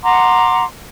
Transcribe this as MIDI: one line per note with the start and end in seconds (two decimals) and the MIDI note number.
0.03 0.64 78
0.03 0.64 82
0.03 0.64 84
0.03 0.64 86